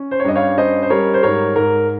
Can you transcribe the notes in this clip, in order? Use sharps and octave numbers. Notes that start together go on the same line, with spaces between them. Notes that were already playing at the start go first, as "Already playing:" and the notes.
Already playing: C#4
C5
C#5
G2 D#5
C#5 F5
C#4 C5 D#5
C5
G3 A#4 C#5
C5
G#2 A#4 C#5
G#2 A#4